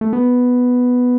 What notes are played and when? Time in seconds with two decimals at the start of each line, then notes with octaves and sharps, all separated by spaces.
0.01 A3
0.13 B3